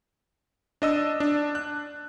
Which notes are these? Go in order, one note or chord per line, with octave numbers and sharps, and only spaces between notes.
D4 D#5 E6
D4
F#6